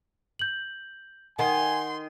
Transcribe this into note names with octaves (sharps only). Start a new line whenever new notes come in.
G6 F#7
D#3 F#5 G#5 C6